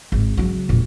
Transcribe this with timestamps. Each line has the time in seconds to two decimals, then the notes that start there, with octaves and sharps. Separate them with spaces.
0.12 G#1
0.37 C#3 F#3
0.69 E1 A#2